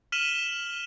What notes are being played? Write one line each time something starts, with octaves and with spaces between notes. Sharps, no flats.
F6 B6 D#7 E7 F#7 G7